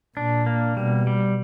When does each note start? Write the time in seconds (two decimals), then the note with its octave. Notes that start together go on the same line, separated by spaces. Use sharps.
0.17 A#2 D4
0.46 A#3
0.77 B2 G3
1.07 G3